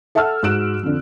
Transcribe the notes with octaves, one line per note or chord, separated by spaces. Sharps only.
A4 E5 F#5 A5 E6 F6
G#2 F#4 F#6 D7 E7
F2 D3